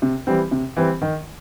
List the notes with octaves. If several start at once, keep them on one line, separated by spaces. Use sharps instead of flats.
C3
E3 G3 C4
C3
E3 G3 C4
D#3